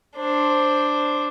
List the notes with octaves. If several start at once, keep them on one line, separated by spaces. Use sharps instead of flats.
D4 C5